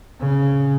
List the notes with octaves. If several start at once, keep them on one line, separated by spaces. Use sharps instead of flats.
C#3